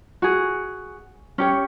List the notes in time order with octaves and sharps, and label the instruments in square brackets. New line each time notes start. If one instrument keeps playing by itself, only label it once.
[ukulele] F#4 G#4
C#4 G4 C#5